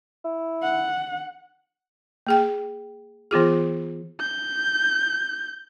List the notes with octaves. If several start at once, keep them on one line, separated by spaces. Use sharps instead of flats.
E4
F#5
A#3 G#4 G5
E3 B3 F4 G#4
G6